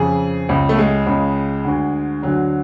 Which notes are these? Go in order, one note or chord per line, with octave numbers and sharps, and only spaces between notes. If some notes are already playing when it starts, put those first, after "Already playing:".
Already playing: F2 C#3 G#4
C#2 C#3
A3
G#3
C#2 C#3
D2 D3
D2 D3 F#3